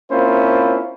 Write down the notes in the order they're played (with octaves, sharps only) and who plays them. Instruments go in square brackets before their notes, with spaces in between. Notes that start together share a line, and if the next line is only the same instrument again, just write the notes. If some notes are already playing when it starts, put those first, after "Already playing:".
[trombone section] A#3 C4 C#4 E4 F4 C5